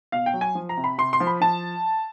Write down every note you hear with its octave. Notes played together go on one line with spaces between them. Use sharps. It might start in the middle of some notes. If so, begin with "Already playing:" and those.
B2 F5
G5
F#3
G#5
F3
A#5
C3
B5
C3 C6
C6
F3
B5
F3 A5